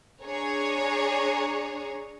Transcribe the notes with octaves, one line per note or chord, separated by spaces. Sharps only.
D4 G#4 C#5 A#5